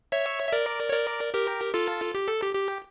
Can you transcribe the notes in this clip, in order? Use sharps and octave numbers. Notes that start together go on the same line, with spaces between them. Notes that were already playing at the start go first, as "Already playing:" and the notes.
C#5 E5
E5
A#4 D5
C#5
A#4 D5
G4 A#4
F4 A4
G4
A4
G4
G4